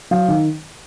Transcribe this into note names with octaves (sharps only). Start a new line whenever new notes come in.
F#3 F5
D#3